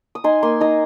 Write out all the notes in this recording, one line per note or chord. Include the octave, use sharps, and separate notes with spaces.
D#6
D#4 G#5 C6
A#3 G#5 C6
D#4 A#5 D#6